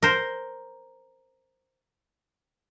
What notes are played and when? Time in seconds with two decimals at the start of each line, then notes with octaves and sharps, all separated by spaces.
0.02 A#4 C5